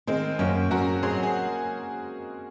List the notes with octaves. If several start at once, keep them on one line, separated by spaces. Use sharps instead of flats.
D#3 G#3 C4
F#2 A#3 C#4
F#2 F#4 A#4
F#3 G#4 C5
G#4